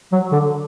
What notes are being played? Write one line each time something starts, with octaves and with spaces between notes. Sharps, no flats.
F#3
D3